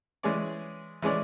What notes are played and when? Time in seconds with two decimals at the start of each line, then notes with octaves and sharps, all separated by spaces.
0.23 E3 G#3 C#4 G#4 D5
1.02 E3 G#3 C#4 G#4 D5